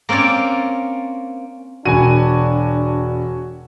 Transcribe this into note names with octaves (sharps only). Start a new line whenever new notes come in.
A#3 C4 C#4 C#5 D5
E1 D4 F#4 G#5 D#7